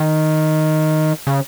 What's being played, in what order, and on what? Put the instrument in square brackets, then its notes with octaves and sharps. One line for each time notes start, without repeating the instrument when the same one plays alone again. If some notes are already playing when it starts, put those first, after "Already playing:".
Already playing: [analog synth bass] D#3
C#3